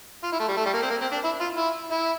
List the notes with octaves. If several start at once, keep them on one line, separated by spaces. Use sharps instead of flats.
F4
E4
A3
G3
A3
G3
A#3
C4
A#3
C4
D4
E4
F4
E4
E4